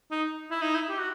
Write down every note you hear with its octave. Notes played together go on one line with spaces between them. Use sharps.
D#4
E4
D#4
E4
G4
F#4